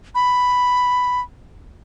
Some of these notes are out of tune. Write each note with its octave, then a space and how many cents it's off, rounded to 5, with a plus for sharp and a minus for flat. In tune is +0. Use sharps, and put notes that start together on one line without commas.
B5 +5